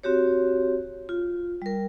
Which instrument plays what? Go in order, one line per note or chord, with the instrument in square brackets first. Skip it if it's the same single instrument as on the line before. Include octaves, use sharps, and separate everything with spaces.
[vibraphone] C4 F#4 G4 C#5
F4
G3 A#4